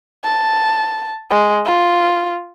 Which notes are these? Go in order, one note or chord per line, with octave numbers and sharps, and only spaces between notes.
A5
G#3
F4